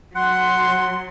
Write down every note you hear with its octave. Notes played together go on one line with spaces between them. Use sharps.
F#3 F#5 C6